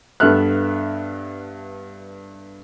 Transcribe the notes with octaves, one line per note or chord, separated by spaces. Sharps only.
G2 B3 A4 E5 F6 F#6